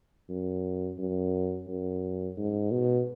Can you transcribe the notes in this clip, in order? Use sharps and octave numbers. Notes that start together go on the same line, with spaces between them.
F#2
F#2
F#2
G#2
B2